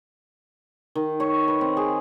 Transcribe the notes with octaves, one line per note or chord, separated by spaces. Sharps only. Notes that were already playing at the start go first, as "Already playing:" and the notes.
D#3
C#5
B4
C4
G#4